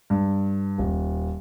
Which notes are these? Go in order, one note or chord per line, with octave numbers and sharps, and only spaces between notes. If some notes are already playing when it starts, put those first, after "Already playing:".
G2
D#1